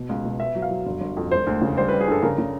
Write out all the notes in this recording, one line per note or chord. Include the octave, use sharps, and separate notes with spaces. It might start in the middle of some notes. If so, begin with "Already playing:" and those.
Already playing: B2
C#2
B2
B3 E5
F#3
F5
F#3
G1
G1
F2
E1 C5
D2
C#3
G3 C5
G3 B4
G#4
G2 A4
C#3 A#4
C#3